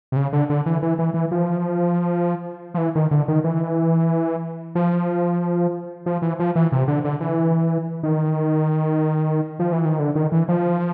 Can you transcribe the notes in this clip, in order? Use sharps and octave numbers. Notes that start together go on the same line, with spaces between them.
C3
C#3
D3
D3
E3
E3
E3
E3
F3
F3
E3
D#3
D3
D#3
E3
F3
F3
E3
F3
E3
C3
D3
D3
E3
D#3
F3
E3
D#3
D3
D#3
E3
F3